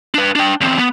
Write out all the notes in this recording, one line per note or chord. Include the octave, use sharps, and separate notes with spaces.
D4 B4
D4 G5
E2 C4
B3